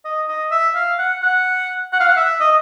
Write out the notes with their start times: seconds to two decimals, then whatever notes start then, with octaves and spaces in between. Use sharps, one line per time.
0.05 D#5
0.28 D#5
0.51 E5
0.75 F5
0.99 F#5
1.22 F#5
1.93 F#5
2.00 F5
2.08 F#5
2.17 E5
2.40 D#5